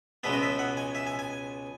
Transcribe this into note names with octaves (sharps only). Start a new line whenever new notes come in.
C#2 B2 G#3 B3 E5
D#5
E5
F#5
G#5
E5
G#5
G#5